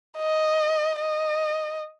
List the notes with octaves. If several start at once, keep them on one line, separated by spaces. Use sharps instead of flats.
D#5
D#5